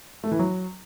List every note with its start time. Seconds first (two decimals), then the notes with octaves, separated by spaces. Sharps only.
0.24 A3
0.31 E3
0.39 F#3